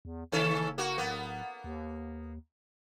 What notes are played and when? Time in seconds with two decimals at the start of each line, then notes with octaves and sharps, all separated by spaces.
0.05 E2
0.32 F#1 D#3 C#4 A4
0.78 A#3 F#4
0.98 D1 A#3 B3
1.64 D#2